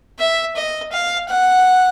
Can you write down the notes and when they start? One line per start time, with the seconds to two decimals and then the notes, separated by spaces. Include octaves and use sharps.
0.19 E5
0.56 D#5
0.92 F5
1.29 F#5